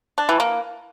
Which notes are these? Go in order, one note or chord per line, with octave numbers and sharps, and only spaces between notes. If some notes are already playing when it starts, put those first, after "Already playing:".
D4
E3
A#3